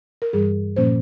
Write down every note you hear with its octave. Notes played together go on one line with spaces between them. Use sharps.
A#4
G2 E3 G3 G#4
A#2 F3 A#3 C#4 C5